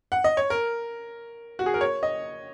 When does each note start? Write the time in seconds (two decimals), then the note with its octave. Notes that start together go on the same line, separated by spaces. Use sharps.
0.12 F#5
0.24 D#5
0.37 C#5
0.50 A#4
1.59 F#4
1.66 G#4
1.74 A#4
1.81 C#5
2.03 D#5